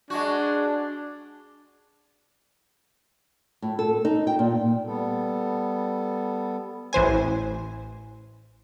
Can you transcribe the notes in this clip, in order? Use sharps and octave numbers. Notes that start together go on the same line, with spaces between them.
G#3 D4 F#4
A2
A4
D#4
G5
A#2
G3 B3 A4
A1 E3 C5 G#5